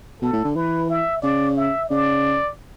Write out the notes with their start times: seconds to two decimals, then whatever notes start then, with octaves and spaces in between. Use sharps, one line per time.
0.22 B2 A4
0.33 A2
0.44 D3
0.55 E3 B4
0.90 E5
1.22 C#3 D5
1.57 E5
1.90 C#3 D5